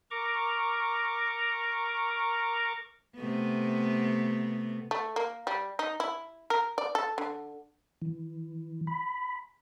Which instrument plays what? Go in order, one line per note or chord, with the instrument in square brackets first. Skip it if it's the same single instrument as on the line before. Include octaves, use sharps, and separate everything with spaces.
[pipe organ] A#4 A#5 C#6 D6
[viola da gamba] C3 A3 B3
[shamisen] A3
A#3
G3
D#4
E4
A#4
D5
A4
D3
[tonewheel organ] E3
B5